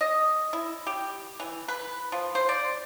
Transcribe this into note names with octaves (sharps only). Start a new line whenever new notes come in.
D#5
E4
G4
E3
B4
F3
C5
D5